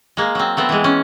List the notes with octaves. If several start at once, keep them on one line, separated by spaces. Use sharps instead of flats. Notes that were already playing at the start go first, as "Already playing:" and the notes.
G#3 A#3
F#3 C4
A3 B3 C4
E3 G#3
C#4